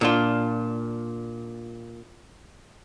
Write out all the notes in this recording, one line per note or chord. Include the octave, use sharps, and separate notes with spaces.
A#2 D4 F4